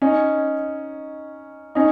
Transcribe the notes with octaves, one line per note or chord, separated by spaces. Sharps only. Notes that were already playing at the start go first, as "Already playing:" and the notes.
C#4 D#4
C#4 D#4